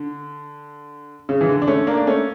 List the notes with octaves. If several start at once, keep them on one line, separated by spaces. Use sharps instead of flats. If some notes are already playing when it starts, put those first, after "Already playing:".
Already playing: D3
C#3
E3
D3
D4
A3 C#4
A#3 D4
D4
A3 C#4